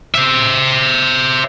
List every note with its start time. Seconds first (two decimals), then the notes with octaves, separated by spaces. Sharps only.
0.15 C5 E5